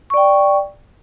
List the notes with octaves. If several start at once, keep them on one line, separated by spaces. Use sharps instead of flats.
D5 G5 C#6